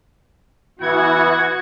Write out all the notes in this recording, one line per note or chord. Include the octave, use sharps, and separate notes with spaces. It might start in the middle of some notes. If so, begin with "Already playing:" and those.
E3 B3 E4 F#4 F#5 G#6